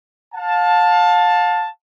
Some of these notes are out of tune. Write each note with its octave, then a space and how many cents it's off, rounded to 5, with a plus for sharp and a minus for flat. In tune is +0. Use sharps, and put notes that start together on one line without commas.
F5 +30 A5 +0